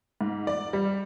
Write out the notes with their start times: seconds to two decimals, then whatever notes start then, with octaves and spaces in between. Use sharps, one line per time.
0.21 G#2
0.47 D5
0.73 G3